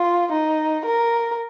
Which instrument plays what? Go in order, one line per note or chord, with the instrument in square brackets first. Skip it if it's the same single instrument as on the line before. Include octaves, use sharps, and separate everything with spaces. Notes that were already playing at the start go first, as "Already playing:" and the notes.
Already playing: [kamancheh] F4
D#4
A#4